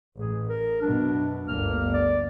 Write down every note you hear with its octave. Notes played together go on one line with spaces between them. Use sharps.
A1 G#4
A#4
F#2 B2 D4
G1 D2 A#3 F6
D5